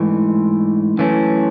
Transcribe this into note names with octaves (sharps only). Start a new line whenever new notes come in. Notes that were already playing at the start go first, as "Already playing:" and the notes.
Already playing: G#2 E3 A3
F#2 E3 A3 C#4